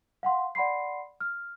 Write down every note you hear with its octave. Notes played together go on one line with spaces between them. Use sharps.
F5 F#5 C6
D5 F#5 B5 C6 C7
F6